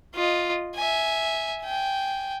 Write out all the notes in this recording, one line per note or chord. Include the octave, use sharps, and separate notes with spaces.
F4 D#5
E5 G#5
G5 G#5